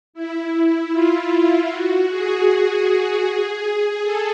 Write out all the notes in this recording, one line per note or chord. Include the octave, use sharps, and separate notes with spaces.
E4
F4
F#4
G#4
A4